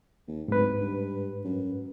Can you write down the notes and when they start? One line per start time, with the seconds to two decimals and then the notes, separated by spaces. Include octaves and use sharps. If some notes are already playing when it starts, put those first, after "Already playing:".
0.28 D#2
0.48 D1 G#2 B4
0.80 G2
1.45 F#2